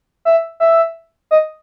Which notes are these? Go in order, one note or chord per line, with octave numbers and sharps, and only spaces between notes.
E5
E5
D#5